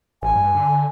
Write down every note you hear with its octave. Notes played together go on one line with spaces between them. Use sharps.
A1 G#5
G2
D3